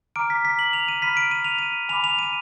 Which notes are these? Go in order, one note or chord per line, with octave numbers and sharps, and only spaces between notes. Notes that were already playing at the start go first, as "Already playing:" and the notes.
A#5 D6 F6 D7
B6
B6
F#7
F7
D#7
B5 F6 B6
D7
D#7
F7
D#7
G#5 B5 D6 F7
F7
D#7